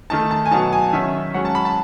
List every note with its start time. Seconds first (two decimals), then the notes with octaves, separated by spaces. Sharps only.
0.10 D#3 A3 D#4 A5
0.31 A5
0.46 G#5
0.51 B2 F#3 B3 D#4 A5
0.72 G#5
0.93 D#3 F#3 C#4 E5
1.34 G#2 F#3 C#4 F#5
1.45 A5
1.55 B5
1.65 A5